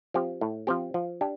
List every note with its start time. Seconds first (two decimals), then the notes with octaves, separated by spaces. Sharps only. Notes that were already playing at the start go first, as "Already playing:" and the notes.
0.14 F3 C4 G4
0.41 A2
0.67 F3 C4 G4
0.94 F3
1.21 D4 G4